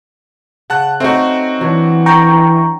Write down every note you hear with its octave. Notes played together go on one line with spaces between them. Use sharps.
C#3 F#5 A5 F#6
A3 C4 C#4 D#4 F#4
E3 F#3 D4
G5 A#5 C#6